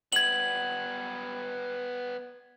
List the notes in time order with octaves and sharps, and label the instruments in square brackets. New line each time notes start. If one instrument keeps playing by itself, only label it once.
[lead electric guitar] G3 B3 [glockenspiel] G#6 F#7